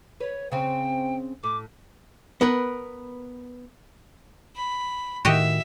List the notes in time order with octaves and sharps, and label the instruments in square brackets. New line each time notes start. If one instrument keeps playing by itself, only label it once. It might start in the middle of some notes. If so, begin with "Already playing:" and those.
[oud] B4 [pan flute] C#5
[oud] C#3 C4 [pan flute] G5
[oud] A2 [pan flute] D6
[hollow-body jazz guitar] B3 A#4 B4
[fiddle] B5
[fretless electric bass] A2 D#3 [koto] F#4 G4 D#5 [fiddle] E5